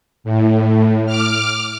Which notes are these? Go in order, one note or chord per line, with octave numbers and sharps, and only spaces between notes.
A2
D6 F6